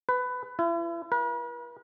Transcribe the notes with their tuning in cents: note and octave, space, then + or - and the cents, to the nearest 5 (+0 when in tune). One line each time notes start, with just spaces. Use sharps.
B4 +15
E4 +40
B4 -45